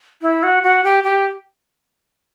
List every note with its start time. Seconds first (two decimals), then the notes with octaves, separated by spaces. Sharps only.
0.22 E4
0.43 F#4
0.63 F#4
0.84 G4
1.03 G4